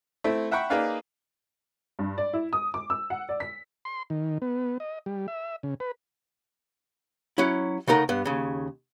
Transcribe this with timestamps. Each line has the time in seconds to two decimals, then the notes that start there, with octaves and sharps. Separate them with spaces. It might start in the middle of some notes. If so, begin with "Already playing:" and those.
0.24 A3 C4 E4
0.51 E5 F#5 G5 B5 C#6
0.70 A#3 D#4 G#4 B4 D5 F5
1.99 G2
2.18 D5
2.33 E4
2.53 D#6
2.74 D6
2.90 E6
3.10 F#5
3.29 D5
3.40 B6
3.85 C6
4.10 D#3
4.42 B3
4.80 D#5
5.06 G3
5.28 E5
5.63 C#3
5.80 B4
7.38 F#3 C#4 E4
7.88 C#3 A3 D#4 A#4 F#5
8.09 G2 B3
8.25 D#2 C#3